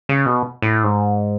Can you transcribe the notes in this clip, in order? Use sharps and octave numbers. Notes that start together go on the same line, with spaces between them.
C#3
B2
A2
G#2